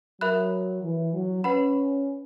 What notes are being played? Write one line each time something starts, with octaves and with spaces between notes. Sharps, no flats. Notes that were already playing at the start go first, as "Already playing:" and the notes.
F#3 A#4 E5 B5 F#6
E3
F#3
C#4 B4 F#5 B5